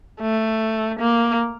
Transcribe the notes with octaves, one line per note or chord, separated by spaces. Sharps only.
A3
A#3